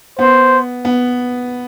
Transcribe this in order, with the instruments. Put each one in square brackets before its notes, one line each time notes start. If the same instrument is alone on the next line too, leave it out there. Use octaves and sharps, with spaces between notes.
[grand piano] B3 [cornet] C5
[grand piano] B3